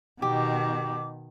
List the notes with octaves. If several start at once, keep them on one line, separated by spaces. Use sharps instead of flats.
B2 D#3 G4 D6